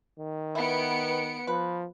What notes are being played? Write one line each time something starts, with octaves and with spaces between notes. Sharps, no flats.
D#3
B3 E4 C#7 D7
F3 B4